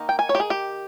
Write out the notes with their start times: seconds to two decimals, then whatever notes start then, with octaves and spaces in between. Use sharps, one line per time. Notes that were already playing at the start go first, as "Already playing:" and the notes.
Already playing: D#3 A#3 D#4
0.09 G5
0.19 G#5
0.29 C#5
0.35 G4
0.40 G#4
0.50 G4